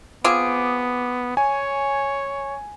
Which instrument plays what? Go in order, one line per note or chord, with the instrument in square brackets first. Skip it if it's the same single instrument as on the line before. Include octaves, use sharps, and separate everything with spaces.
[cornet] B3 [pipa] C4 F4 G#4 [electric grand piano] D6 D7
[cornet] C#5 [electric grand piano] G#5